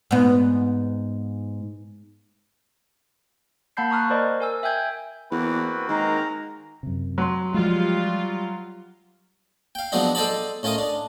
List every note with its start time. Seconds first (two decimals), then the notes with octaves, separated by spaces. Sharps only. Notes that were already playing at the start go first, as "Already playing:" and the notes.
0.11 G#2 B3
3.77 A#3 F#5 A5 B5 G6 C7
3.90 A#5 C#6 D#6 F6 F#6
4.10 A#4 C5 D5 D#5
4.40 A#4 G#5 E6
4.63 E5 G5 G#5 G6 G#6
5.31 E2 A#3 C4 F#4 B4
5.89 D#3 G#3 A#5
6.83 F#2 C3
7.18 F#3 C6
7.54 F3 G3 G#3 F4
9.75 F5 G5
9.92 F3 F#3 G#3 B3 D4 D#4
10.15 A4 C5 D5 D#5 A5 B5
10.63 A2 C#4 F4 A#4 D#5 D#6
10.78 D4